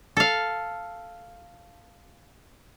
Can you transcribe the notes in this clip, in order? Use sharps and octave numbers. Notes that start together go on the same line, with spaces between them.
A4 F5